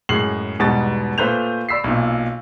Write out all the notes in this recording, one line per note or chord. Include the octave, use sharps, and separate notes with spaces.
F#2 A2 G#3 C7 F#7
E2 G#2 B2 G3 B3 A6
A#2 A3 B4 C5 G6 F7
D5 B5 E6 B6 C7
B1 A#2